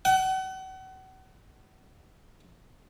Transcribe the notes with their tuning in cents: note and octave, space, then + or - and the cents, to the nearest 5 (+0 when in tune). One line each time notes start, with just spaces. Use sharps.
F#5 +35